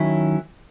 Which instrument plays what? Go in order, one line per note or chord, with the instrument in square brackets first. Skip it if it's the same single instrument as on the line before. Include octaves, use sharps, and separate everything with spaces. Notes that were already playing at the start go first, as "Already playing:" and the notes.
Already playing: [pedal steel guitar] D#3 F#3 C#4 E4